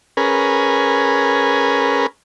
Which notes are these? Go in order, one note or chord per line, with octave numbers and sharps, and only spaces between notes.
C#4 G#4 A#4 B4